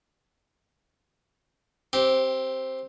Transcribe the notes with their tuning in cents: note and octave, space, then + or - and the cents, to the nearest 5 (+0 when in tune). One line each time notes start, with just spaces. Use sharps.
C4 +5 G4 -15